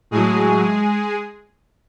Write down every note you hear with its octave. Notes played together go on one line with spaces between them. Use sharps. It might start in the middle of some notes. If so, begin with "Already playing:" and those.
A2 F#3 G#3 G#4